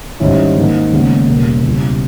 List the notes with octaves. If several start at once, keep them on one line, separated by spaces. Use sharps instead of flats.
G#1 G#2 G3 C#4 E4
G#2 D#3 A#3
D#2 C#3 G#3 B3
E1 E2 C#3 G3 A#3
C#2 B2 G3 C#4 E4